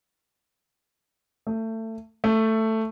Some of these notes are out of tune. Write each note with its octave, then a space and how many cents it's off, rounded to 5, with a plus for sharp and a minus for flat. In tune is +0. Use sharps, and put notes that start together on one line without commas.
A3 +25
A3 +10